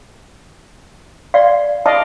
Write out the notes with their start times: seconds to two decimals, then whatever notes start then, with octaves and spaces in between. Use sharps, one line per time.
1.34 D5 F5 C6
1.86 D5 D#5 F5 A5